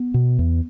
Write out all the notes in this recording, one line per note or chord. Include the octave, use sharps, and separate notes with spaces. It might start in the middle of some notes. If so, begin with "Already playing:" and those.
Already playing: B3
B2
E2